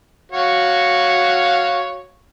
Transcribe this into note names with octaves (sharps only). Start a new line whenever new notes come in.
F#4 C#5 F5